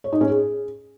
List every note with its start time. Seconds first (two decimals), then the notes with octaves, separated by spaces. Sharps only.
0.04 C#5
0.13 D#4
0.21 C#4
0.29 G#4